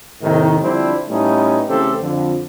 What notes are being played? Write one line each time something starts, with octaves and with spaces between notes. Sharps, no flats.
D#2 A2 C3 D#3
D3 F3 G3 C4 D4 E4
A2 G3 A3 B3 C#4 D#4
C#3 E3 A3 C4 G4 A4
F2 D3